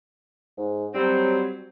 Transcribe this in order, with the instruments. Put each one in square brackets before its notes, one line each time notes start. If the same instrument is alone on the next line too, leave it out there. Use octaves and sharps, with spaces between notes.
[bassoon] G#2
[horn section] F#3 C4 [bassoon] G3